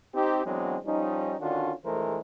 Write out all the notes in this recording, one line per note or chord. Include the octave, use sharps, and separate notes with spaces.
C4 D#4 G4
E3 F#3 G#3 B3 C4 D4
F3 G3 C#4 D#4
D3 D#3 C#4 D4 F4 F#4
A#1 E3 G#3 A3 A#4 C5